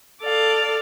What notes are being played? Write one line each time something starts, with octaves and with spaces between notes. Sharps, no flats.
A4 D5 F5